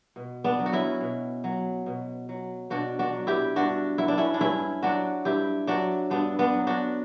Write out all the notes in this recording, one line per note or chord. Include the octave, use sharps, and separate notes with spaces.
B2
B3 D4
F#3
F#4
C#4 E4
B2
F#3
B2
F#3
B2 D4 F#4
D4 F#4
F#3
E4 G4
G2 D4 F#4
F#3 E4
D4
C#4 E4
D4
G2 C#4 E4
F#3 D4 F#4
G2 E4 G4
F#3 D4 F#4
G2 B3 D4
B3 D4
F#3
D4 F#4